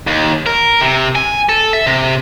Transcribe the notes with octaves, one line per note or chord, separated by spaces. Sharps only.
D#2
A#4
C3
G#5
A4
E5
C3